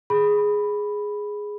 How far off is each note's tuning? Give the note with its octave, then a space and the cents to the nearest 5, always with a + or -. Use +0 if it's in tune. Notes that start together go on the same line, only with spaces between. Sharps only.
G#4 +0 B5 +0